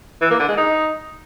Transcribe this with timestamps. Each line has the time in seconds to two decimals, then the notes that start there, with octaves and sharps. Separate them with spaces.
0.21 E3
0.30 A#3
0.39 D3
0.48 G#3
0.57 D#4